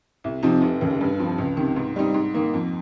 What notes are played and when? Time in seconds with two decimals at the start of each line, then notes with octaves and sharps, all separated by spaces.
0.24 C2
0.43 C3 F3 C4 D#4
0.62 F1
0.81 D#2 C#3
1.01 G2
1.19 F3 C4
1.38 C#2
1.57 C3 D#3
1.76 G#2
1.96 G3 C4 D#4
2.14 G#2
2.34 D#3 A#3 D#4
2.54 F2